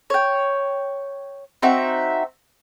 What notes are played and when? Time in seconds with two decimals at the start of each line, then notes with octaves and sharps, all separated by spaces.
0.10 C#5 G5
1.62 C4 D#4 F#4 E5